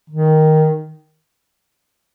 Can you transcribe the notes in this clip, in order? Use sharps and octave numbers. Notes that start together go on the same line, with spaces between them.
D#3